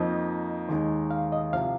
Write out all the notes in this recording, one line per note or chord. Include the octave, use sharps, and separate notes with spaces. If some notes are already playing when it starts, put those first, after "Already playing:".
Already playing: F2 F3 A#3 D#4 D#5
D#2 D#3 G#3 D#4
F5
D#5
C2 C3 F3 F5